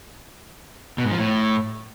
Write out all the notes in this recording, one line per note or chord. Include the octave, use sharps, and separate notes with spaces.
B2
G#2
F3
A2